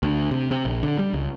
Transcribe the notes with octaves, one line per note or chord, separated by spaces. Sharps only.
D2
C3
C3
A#1
D3
G3
C#2